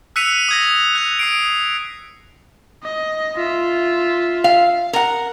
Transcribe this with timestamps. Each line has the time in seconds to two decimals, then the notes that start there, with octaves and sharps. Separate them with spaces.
0.16 E6 F#6 B6 C#7 D#7 F7
0.49 D#6 G#6 A#6
0.95 F#6 F7
1.19 D#6 C7 D7
2.84 D#5
3.36 F4 E5
4.44 F5
4.93 A#4 F#5